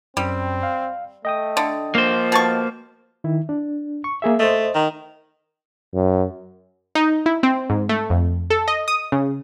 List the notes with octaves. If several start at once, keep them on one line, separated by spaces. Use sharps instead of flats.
F#2 G3 C4
F5
A3 D#5 G5 D#6
D3
F3 A#3 C5
B2 A5 C#6
D#3 E4
D4
C#6
A#3 G#4 E5
A3 C5 D#5
D#3
F#2
D#4
E4
C4
G#2
A3
F2
A4
D#5
D#6
C#3